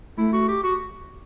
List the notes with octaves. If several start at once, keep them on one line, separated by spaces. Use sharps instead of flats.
A3 E4
F#4
G4
F#4